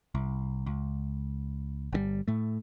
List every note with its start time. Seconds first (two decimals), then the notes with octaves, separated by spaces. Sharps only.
0.15 C2
0.66 C#2
1.93 G1 D3 G3
2.28 A2 A3